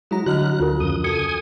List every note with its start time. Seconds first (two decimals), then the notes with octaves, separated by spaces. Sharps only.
0.11 F#3 G#3 E4 A#5
0.26 D3 F#3 F#4 D#5 F6 F#6
0.60 D2 D3 F4 A#4
0.80 F2 C#3 D#6
1.04 F#4 A4 G#5 D#6 C#7